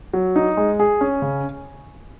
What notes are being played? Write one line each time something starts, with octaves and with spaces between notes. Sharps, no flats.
F#3
D#4
G#3
G#4
C#4
C#3